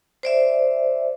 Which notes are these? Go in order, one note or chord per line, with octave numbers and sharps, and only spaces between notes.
C5 D5 E5